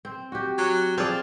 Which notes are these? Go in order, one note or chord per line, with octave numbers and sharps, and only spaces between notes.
C4
F#4 G4
F#3
F3 C4 G#4 D5